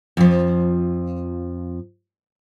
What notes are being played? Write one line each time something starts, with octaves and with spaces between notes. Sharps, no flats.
F2 F3